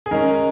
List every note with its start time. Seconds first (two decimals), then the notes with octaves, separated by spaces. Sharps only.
0.06 G#4
0.11 D#3 G#3 C#4 A#4